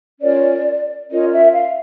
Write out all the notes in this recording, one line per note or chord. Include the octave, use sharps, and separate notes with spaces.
C#4 F4 A#4 C#5 D5
C#4 F4 A#4 C#5 D#5
E5
F5